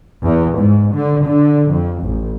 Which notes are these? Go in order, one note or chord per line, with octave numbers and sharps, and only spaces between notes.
E2
G#2
D3
D3
F2
A1